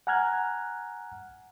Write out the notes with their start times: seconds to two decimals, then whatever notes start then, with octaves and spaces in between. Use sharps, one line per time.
0.07 F#5 G#5 A#5 F6 F#6 G#6